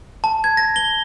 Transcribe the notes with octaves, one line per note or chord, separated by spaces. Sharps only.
A5
G#6
A#6
G7